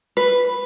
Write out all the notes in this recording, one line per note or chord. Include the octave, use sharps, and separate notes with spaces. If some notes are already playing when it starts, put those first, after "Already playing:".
B4